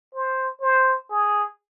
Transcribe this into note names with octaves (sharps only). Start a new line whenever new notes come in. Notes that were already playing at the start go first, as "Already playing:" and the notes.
C5
C5
G#4